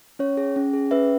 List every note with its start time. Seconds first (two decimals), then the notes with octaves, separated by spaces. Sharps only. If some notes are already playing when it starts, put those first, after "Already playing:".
0.19 C#4 C#5
0.37 G#4
0.56 C#4
0.73 G#4
0.91 C#4 B4 E5